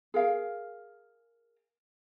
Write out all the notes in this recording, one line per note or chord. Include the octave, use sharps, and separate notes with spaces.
G#4 A#4 F5